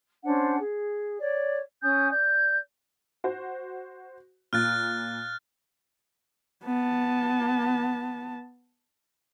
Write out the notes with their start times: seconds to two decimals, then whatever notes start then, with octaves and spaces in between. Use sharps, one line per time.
0.24 C#4 D4 C5 F#5
0.59 G#4
1.20 C#5 D5
1.82 C#4 G#5 D#6 G6
2.11 D5 G6
3.24 F#4 C5
4.53 A#2 F6 F#6 A6
6.65 B3 A5